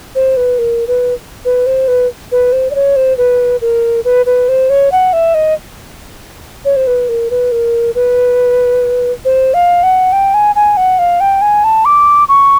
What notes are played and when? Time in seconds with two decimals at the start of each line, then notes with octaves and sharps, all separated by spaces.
0.15 C5
0.37 B4
0.59 A#4
0.87 B4
1.45 B4
1.66 C5
1.88 B4
2.32 B4
2.53 C5
2.71 D5
2.75 C#5
2.96 C5
3.18 B4
3.61 A#4
4.05 B4
4.26 B4
4.49 C5
4.70 C#5
4.92 F#5
5.13 E5
5.34 D#5
6.65 C#5
6.76 C5
6.87 B4
7.09 A#4
7.30 B4
7.52 A#4
7.95 B4
9.25 C5
9.54 F5
9.83 F#5
10.12 G5
10.34 G#5
10.55 G#5
10.77 F#5
10.99 F5
11.20 G5
11.42 G#5
11.64 A5
11.85 D6
12.28 C#6